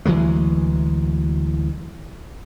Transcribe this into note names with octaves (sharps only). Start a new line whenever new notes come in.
D2 E3 F#3 G#3